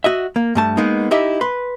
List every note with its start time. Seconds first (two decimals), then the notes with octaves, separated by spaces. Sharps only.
0.04 F#4 D#5 E5
0.36 A#3
0.55 G2 A3 A5
0.77 G#3 A#3 B3 D#4
1.11 D#4 E4 G4 D#5 E5
1.41 B4 C6